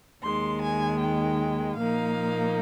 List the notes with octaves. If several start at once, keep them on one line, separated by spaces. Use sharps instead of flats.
D#2 D#3 G#3 C6
G#5
G5
A#2 F3 A#3 D#4 F5